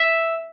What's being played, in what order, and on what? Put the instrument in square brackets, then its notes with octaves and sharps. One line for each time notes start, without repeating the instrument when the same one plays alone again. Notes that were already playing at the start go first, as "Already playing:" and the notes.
Already playing: [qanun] E5